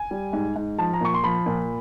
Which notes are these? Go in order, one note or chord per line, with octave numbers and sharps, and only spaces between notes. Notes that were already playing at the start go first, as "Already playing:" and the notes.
Already playing: G#5
G3
G#2
G#2
F3 A5
A#5
A#2 C#6
C6
F3 B5
A#2